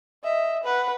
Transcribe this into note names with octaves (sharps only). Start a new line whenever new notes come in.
D#5 E5
B4 F#5